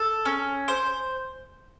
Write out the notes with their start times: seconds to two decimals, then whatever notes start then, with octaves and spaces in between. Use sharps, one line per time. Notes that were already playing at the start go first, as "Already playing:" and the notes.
Already playing: A4
0.25 C#4
0.68 C5